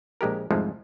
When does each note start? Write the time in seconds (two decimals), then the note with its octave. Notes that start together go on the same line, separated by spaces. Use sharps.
0.21 A#1 G#3 G4 A#4
0.51 C2 F2 G#2 F3 G#3 A3